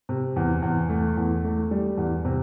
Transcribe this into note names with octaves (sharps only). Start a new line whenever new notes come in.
C3
E2
E2
A3
E2
A3
G3
E2
C3